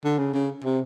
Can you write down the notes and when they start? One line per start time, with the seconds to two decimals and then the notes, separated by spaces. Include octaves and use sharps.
0.04 D3
0.18 C#3
0.33 C#3
0.64 C3